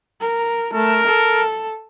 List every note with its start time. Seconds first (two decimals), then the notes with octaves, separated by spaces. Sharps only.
0.21 A#4
0.73 A3 A#4
1.07 A4